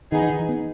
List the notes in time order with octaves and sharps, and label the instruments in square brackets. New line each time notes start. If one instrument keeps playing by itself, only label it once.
[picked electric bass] D#3 [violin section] B3 D#4 G#4
[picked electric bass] E3
D#3
E3
B3